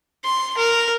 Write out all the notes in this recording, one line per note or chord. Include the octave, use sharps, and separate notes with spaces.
C6
A#4